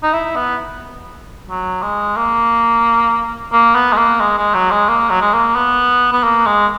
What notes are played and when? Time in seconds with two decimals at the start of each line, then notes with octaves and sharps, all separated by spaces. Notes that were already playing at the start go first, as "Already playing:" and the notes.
0.03 D#4
0.14 E4
0.36 B3
1.49 F#3
1.83 G#3
2.17 A#3
3.52 A#3
3.75 B3
3.93 G#3
3.97 A#3
4.20 G#3
4.38 G#3
4.54 F#3
4.71 G#3
4.89 A#3
5.10 F#3
5.21 G#3
5.33 A#3
5.56 B3
6.13 B3
6.23 A#3
6.46 G#3